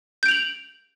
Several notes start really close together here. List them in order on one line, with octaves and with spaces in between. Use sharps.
G6 D7 F7 F#7